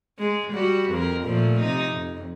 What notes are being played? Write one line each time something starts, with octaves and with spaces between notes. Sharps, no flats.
G#3
G3 F#4
F2 A#4
A#2 F3 A3
C3 D#4
F2